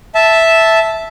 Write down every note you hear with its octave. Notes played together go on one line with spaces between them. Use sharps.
E5 A5